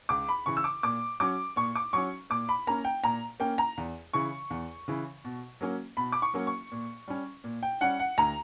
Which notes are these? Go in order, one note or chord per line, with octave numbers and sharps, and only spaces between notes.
C#2 D6
B5
C#3 E3 C#6
E6
D6
A#2 D6
F#3 C#4 D6
A#2 C#6
D6
F#3 C#4 C#6
A#2 D6
B5
A#3 C#4 A#5
G5
A#2 A#5
A#3 C#4 G5
A#5
E2
C#3 E3 C#6
E2
C#3 E3
B2
F#3 A#3 C#4
B2 B5
D6
C#6
F#3 A#3 C#4
C#6
A#2
G3 C#4
A#2
G5
G3 C#4 F#5
F#5
D2 A#5